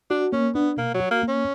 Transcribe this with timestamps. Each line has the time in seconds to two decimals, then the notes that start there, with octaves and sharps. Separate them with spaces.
0.10 D4 F#4
0.32 A#3 C#4
0.55 B3 D4
0.77 B2 A#3
0.94 F#3
1.00 F#4
1.11 A#3
1.23 A#3
1.28 C#4